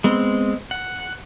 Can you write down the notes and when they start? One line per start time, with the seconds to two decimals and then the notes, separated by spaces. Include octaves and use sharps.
0.04 G#3 B3 C4
0.71 F#5